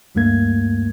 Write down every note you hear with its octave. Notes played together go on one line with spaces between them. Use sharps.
D2 G2 G3 A3 A#3 G#6